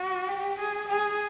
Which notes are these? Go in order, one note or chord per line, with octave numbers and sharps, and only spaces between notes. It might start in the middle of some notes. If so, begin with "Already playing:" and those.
Already playing: F#4
G4
G#4
G#4